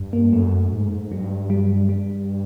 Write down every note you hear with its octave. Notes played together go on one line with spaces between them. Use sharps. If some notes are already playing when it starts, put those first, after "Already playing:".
Already playing: G2
A#3
F#2 A3
G#2
G2 F#3
G3
G3